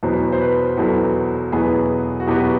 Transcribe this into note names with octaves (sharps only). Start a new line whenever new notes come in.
E2 B2 F#3 B3 C5
C5
B4
E2 B2 F#3 B3 A4
E2 B2 F#3 B3 G#4
F#4
E2 B2 F#3 B3 G4